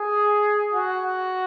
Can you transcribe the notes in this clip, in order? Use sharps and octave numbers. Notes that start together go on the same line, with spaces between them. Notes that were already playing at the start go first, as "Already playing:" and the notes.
Already playing: G#4
F#4